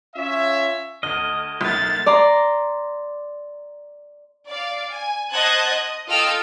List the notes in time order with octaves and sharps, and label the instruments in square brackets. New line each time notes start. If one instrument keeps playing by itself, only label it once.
[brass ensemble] C#4 F4 C#5 E5
[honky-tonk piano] D2 F6 [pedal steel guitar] D#5
[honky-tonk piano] B1 E5 F6 [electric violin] A#3 A6
[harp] D5 A#5 C6
[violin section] D5 F5
G#5
C5 D#5 F#5 A5 F#6 G#6
D#5
F4 A4 D#5 G5 E6 F6